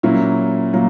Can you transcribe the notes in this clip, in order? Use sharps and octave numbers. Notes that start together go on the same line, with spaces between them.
A#2 F#3 A#3 C#4 E4
A#2 F#3 A#3